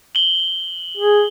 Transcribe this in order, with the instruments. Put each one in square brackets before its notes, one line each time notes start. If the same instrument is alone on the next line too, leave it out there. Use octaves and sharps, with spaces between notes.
[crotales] F#7 G7
[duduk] G#4